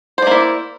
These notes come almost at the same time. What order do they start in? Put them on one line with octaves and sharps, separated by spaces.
C5 D5 A#3 E4